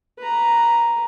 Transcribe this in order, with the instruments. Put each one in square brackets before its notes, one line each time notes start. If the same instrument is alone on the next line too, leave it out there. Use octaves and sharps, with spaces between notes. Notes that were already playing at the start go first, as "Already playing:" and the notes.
[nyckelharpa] B4 A#5